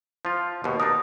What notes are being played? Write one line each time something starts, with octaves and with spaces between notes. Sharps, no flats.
F3 F4
D#2 B2
D4 D#4 A#4 D#6